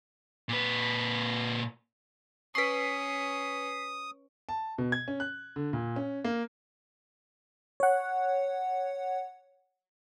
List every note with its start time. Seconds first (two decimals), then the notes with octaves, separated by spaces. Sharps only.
0.49 A#2 B4
2.55 C#4 B4 C#6 D#6 B6 C7
4.49 A5
4.78 B2
4.92 G#6
5.08 C#4
5.20 F#6
5.56 D3
5.73 A#2
5.96 C#4
6.24 A#3
7.80 C#5 F#5